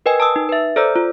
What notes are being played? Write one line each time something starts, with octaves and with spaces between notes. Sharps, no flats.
A#4 B4 D#5 G5 G#5
A5 D#6 E6
D#4
B4 E5
A4 C5 D5 A#5 E6
F4